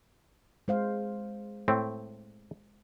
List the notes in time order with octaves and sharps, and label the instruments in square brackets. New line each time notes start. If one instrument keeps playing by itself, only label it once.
[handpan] G#3 C5 F5
[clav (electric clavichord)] A2 A3 C4